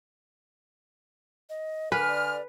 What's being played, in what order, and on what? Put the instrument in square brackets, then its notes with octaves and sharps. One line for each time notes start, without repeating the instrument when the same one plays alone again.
[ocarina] D#5
[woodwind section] D3 F6 [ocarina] A#4 [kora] B4 [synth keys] G#5
[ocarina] D5